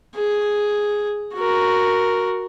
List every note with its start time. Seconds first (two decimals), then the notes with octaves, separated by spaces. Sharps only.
0.16 G#4
1.34 F#4 A#4